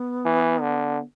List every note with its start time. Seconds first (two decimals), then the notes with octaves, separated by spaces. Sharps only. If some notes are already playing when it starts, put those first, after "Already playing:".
Already playing: B3
0.25 E3
0.61 D3